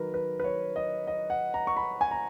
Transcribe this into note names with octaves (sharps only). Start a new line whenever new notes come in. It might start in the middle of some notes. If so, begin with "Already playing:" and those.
Already playing: D#3 F#3 A#4 B4
B4
B4
C#5
D#5
D#5
F#5
A#5
C#6
B5
G#5
A#5